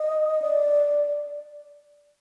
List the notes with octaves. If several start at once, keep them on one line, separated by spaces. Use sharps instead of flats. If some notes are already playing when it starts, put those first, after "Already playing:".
Already playing: D#5
D5